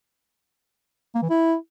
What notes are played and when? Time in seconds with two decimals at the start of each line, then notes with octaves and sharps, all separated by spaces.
1.15 A#3
1.22 E3
1.30 E4